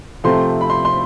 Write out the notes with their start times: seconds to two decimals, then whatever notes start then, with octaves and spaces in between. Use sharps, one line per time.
0.24 C3 F3 A3 C4 C6
0.61 B5
0.70 C6
0.85 C6